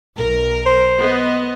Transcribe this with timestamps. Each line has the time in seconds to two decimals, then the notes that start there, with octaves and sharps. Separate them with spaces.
0.17 B1 A#4
0.66 C5
0.99 B3 D#5